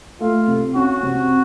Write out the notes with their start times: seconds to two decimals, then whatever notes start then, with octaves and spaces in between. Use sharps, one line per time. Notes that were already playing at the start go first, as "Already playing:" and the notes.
0.21 A3 F4
0.48 C3
0.75 C#4 F#4
1.03 C3